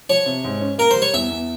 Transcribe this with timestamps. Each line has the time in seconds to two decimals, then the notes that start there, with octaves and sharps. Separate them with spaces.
0.09 F3 C#5
0.26 C3
0.44 G#2
0.61 C#4
0.78 A#3 A#4
0.91 G3 C5
1.02 C#5
1.14 E2 E5
1.30 E2